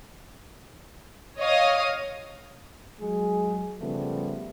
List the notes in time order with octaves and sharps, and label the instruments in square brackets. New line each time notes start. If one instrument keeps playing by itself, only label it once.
[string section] C#5 D#5 F5 D#6
[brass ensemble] F#3 G#3 G#4
C#3 F3 G3 A3 B3